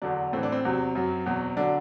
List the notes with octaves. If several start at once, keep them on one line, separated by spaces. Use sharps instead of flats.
E2 D3 F#3 D4
A2 E3 C4
D4
C4
E2 C3 F#3
F#2 F#3
E2 B2 F#3
D3 F#3 D4